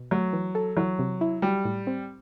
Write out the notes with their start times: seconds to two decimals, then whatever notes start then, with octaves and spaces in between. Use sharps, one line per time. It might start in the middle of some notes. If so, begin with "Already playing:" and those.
Already playing: B2
0.11 F#3 A3
0.33 E3
0.55 A4
0.77 E3 F#3
0.99 C3
1.21 E4
1.42 F#3 G3
1.65 A2
1.87 C4